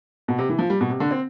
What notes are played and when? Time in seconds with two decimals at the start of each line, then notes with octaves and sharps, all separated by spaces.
0.28 B2
0.38 C3
0.49 E3
0.59 F3
0.70 G3
0.81 B2
0.90 C3
1.00 D3
1.11 C4